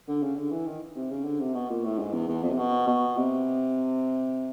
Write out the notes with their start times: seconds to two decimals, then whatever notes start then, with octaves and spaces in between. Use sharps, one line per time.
0.08 D3
0.23 C#3
0.36 D3
0.51 E3
0.66 D#3
0.96 C3
1.11 C#3
1.25 D3
1.40 C3
1.54 B2
1.70 A#2
1.84 A2
1.99 G#2
2.13 E2
2.28 E2
2.42 F2
2.51 C3
2.58 B2
2.87 B2
3.17 C3